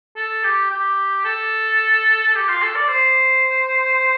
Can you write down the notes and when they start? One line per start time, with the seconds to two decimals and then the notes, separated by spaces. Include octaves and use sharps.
0.16 A4
0.44 G4
0.71 G4
1.25 A4
2.27 A4
2.35 G4
2.48 F4
2.62 A4
2.76 D5
2.88 C5